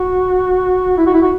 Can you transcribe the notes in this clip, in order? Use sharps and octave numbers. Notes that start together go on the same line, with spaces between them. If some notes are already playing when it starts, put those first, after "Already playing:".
Already playing: F#4
E4
F#4
E4
F#4